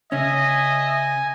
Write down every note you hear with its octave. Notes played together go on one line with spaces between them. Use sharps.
C#3 C#4 D#5 E5 G#5